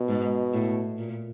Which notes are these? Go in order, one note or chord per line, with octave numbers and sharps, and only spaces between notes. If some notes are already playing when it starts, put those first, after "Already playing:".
Already playing: B2
G#2
A2
A#2